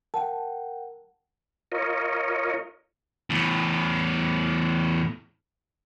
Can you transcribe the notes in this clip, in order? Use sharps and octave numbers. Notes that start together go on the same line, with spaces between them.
A#4 F#5 G5 A5
F4 A#4 C#5 D#5
E2 A2